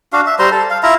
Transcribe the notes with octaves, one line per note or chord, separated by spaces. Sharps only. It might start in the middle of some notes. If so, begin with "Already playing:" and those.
D4 F#4 F5
E5
G3 C5 A#5 C6
A4
F5
E4 F4 E5 A#5